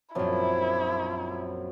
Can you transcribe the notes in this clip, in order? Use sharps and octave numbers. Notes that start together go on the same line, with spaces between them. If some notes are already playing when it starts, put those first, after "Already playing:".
A#1 F#2 F3 F#3 C4 E4